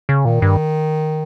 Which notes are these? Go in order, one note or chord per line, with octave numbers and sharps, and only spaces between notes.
C#3
A#2 D#3
G2